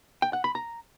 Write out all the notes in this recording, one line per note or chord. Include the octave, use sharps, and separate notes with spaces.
G5
F#5
B5
A#5